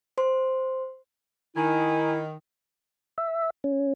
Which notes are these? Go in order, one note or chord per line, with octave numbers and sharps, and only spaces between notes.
C5 C6
D#3 E4 G#5
E5
C#4